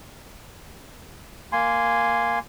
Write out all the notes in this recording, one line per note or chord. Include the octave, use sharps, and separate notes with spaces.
A#3 G#5 C6